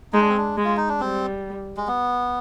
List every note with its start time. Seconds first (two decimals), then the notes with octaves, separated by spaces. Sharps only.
0.13 G#3 D#4
0.21 D4
0.29 C4
0.37 D4
0.57 G#3
0.64 F4
0.77 D#4
0.89 D4
1.00 G3 C4
1.77 G#3
1.87 B3